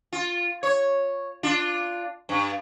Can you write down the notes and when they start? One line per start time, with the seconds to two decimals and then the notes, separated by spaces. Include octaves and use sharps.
0.13 F4
0.63 C#5
1.43 D4 F4
2.29 G2